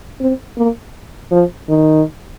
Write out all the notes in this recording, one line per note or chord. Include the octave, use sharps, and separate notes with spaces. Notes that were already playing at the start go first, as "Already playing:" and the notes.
C4
A#3
F3
D#3